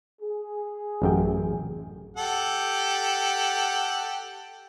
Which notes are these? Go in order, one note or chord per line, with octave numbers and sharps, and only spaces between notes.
G#4
A1 F#2 G5
G4 A4 F#5